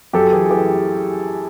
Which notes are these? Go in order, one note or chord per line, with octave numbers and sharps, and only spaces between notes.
F#2 G4 A4
E3 G#4
E3 G4